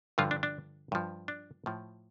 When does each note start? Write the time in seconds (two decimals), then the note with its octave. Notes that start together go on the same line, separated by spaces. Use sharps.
0.18 G2 D3 F3 F4
0.31 D4
0.43 D4
0.92 G2 F3
1.28 D4
1.66 A2 F3